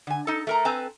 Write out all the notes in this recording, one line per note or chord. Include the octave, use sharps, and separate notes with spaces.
D3 G#5
D#4 A4
A3 A#4 A#5
C4 A4 B4 G#5 A#5